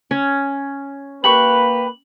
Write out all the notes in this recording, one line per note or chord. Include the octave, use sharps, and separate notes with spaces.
C#4
A#3 G4 B4 B5 C#6 F#7